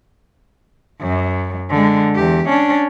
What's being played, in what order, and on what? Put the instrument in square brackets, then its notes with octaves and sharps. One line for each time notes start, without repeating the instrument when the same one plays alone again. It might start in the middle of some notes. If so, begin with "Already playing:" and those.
[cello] F#2
D3 G#3
E2 G4
C#4 D4